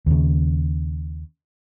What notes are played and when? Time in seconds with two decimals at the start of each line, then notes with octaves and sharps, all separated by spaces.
0.06 D#2 C#3